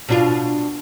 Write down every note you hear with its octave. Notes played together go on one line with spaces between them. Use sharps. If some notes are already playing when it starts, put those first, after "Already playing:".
B2 D4 F4